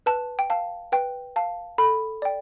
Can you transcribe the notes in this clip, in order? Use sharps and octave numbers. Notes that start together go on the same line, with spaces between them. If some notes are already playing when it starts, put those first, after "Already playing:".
B4 A5
G5
F5 A5
B4 G5
F5 A5
A4 B5
D5 G5